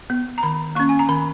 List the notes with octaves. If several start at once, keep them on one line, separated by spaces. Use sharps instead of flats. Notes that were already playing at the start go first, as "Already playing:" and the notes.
B3
A#5
D#3 B5
A#3 C#4 C#6
G#5
A#5
D#3 B5